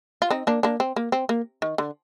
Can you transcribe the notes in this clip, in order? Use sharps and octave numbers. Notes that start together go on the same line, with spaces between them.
F4
C4 D#4
A#3 D4
A#3 D4
C4
A#3
C4
A#3
D#3
D3